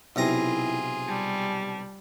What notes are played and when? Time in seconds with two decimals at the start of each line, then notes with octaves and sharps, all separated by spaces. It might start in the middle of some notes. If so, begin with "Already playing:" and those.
0.16 B1 C3 E4 F4 G#4 A#5
1.08 G3 A5